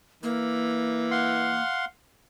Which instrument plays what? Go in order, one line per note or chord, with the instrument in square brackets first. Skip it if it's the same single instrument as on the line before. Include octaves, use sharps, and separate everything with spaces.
[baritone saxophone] E3 [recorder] A#3
[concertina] F5 F#5 C6